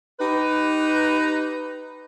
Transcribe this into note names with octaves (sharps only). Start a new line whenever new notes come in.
D#4 G4 B4